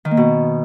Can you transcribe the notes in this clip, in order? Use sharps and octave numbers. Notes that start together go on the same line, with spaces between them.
D#3
A#3
B2